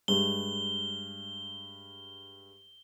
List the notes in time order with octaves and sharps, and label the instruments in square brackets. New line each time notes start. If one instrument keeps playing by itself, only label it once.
[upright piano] G2 G#3 [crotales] G7